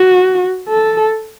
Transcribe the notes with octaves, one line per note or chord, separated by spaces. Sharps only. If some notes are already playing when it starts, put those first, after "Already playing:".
Already playing: F#4
A4